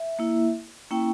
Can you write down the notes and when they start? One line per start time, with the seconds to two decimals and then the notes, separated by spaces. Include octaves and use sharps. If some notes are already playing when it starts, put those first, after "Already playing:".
Already playing: E5
0.19 A#3 E4
0.91 A#3 C#4 E4 G5